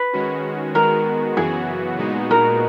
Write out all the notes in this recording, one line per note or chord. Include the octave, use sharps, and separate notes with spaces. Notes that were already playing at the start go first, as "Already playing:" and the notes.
Already playing: B4
D#3 G#3 C#4 F#4
D#3 G#3 B3 F#4 A#4
F#2 C#3 E3 B3 F#4 G#4
A#2 G#3 B3 D#4 F#4
A#4